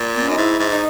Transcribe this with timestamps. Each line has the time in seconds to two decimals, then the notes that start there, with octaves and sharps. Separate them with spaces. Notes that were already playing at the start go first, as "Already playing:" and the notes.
Already playing: A#2
0.14 B3
0.22 C#4
0.28 F#2 D#4
0.37 G#2 E4
0.59 G#2
0.70 D#4